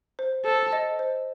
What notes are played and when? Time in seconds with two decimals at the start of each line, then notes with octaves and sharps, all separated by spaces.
0.19 C5
0.45 A4 C5
0.73 D#5
0.99 C5